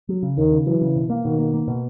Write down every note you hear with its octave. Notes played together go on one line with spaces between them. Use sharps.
F#3
C#3
D#2 D#3
C#3
E3 F#3
C#3
B2
A#3
B2 D#3
A#3
A#3
B2